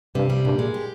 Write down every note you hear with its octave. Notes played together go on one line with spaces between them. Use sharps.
G2 C3
G3
G2 A#2
G#3
G4